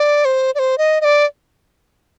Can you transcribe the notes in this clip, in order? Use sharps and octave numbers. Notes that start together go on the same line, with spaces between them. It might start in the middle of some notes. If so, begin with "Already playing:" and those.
Already playing: D5
C5
D5
C5
D#5
D#5
D5